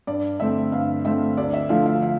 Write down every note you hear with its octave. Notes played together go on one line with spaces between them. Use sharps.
G2 D5
D3 A3 C4 E5
G2 F5
D3 A3 C4 E5
D2 D5
E5
D3 F3 A3 F5
F5
F5